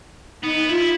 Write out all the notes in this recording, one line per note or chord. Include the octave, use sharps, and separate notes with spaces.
B3 D#4
E4 F4